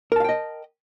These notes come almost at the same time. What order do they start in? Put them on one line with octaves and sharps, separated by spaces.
A#4 A5 F5 G5 D#5